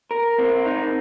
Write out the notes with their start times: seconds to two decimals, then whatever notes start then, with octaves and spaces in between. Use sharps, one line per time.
0.11 A#4
0.38 C4
0.66 D#4